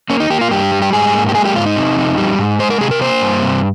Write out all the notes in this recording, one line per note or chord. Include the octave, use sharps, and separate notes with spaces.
A#3 C#4
D#4
A#3 G4
F4
G2 G4
G3
G4
G#2 G#4
A#3
G4
G#3 G#4
G4
G#2 F4
D#4
C3
F2
G3
G#2
G#3 C5
A#4
C3 G#4
A#4
A#3 C5
G2
C3